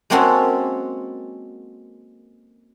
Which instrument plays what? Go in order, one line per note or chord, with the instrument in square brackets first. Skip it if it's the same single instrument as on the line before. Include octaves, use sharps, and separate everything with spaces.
[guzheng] G#3 A#3 C4 C#4 F#4 A4